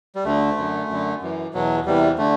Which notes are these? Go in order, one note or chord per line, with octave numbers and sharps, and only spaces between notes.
G3
D2 D3 A3
F#2 D3
F#2 D3
F#2 E3
E2 B2 F#3
E2 C3 E3 G3
D3 A3